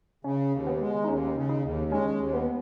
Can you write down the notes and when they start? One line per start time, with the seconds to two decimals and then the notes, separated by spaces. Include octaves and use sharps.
0.24 C#3 C#4
0.53 D#2
0.67 B3
0.80 G#3
1.04 D#4
1.08 D#2 C#4
1.35 C#3
1.49 D#4
1.64 D#2
1.92 G#3 C#4
2.19 D#2
2.33 B3